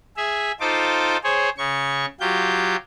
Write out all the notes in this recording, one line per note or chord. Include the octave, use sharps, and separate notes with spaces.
G#4 E5
D#4 F4 A4 C5 D6
G#4 C5 C#5
C#3 C#6
F#3 F4 G4 G6